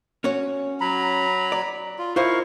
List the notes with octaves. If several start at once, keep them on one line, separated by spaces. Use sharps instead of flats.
C#4 F#4 C#5
F#3 A#5 B5
D5
F4
E4 F4 A#4 C5 D#5 F5 C#6